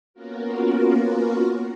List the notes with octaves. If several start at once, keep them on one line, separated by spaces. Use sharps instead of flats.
A#3 B3 C#4 F4 F#4 A#4